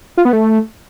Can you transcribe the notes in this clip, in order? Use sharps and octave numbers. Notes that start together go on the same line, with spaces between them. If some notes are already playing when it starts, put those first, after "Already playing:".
F4
B3
A3